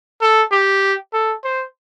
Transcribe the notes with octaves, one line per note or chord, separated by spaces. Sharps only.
A4
G4
A4
C5